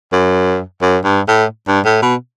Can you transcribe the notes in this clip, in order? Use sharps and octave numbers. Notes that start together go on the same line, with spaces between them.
F#2
F#2
G2
A2
G2
A2
B2